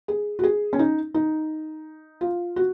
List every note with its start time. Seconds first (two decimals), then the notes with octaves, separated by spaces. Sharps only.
0.08 G#4
0.39 F#4
0.44 G#4
0.73 C#4
0.79 D#4
1.14 D#4
2.21 F4
2.56 F#4